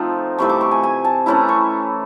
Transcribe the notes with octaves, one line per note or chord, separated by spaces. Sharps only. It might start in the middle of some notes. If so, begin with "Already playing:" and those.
Already playing: F3 A3 C4 D#4
C3 E3 A3 C4 C#6
D6
C#6
G#5
G#5
A5
E3 A3 C#4 E4 A#5
C#6